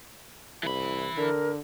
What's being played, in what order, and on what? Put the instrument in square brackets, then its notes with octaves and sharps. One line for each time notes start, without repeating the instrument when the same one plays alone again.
[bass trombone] C2 [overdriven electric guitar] E3 B5
[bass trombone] D3 [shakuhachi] A#4